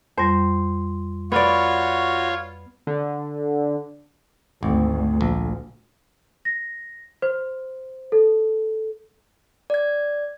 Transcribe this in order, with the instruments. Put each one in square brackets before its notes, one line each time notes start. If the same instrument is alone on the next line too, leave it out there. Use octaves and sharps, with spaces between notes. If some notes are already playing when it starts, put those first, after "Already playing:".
[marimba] F2 G3 [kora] C5
[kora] B3 D5 [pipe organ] F4 C#5 [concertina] F#4
[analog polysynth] D3
[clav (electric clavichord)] G#1 [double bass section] D2
[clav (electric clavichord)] A#1
[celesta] A#6
C5
A4
[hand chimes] D5 G#6